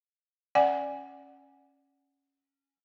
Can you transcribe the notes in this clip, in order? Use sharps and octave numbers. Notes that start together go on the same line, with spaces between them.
C#4 D5 F#5 G#5